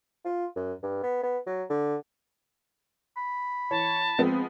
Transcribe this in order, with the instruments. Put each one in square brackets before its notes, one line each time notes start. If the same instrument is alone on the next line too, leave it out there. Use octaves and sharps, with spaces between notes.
[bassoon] F4
F#2
G2
B3
B3
F#3
D3
[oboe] B5
[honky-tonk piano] E3 [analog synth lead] C#5 [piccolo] A5
[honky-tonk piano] F3 G#3 B3 [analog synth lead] C4